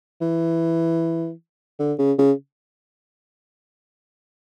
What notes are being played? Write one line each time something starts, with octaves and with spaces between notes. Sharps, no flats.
E3
D3
C#3
C#3